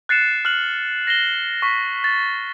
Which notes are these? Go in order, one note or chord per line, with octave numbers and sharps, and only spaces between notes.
F#6 A6 C7 C#7 E7
F6 F#6 F#7
A#6 C7 E7 G7
C#6 B6
A6